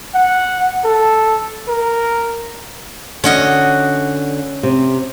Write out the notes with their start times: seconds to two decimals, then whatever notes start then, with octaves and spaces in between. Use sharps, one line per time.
0.14 F#5
0.84 A4
1.68 A#4
3.24 D3 C#4 F#4 D#5
4.63 C3